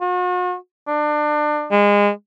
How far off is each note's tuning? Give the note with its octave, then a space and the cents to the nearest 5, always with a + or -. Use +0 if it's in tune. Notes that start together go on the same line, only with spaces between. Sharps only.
F#4 -40
D4 +30
G#3 -25